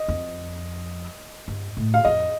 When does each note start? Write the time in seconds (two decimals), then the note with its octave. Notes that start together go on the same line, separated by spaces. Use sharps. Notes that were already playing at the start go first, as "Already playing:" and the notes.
Already playing: D#5
0.08 F2
1.48 G2
1.77 A2
1.94 F5
2.05 F2 D#5